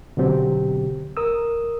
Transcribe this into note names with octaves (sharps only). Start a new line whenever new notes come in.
B2 D3 F#3 C4 G4
A#4 D#6 E6